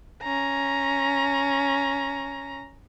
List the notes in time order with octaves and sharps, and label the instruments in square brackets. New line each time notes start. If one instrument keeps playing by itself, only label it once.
[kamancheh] C#4 A#5